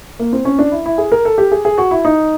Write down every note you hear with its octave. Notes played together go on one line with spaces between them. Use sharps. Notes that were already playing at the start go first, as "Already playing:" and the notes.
A#3
C4
C#4
D4
E4
E4
G#4
A#4
A4
G4
G#4
G#4
F#4
E4
D#4